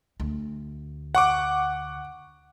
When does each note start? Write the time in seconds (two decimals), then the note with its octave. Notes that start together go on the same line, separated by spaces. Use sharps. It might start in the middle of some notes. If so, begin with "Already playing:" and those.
0.20 D2
1.15 F#5 C#6 D6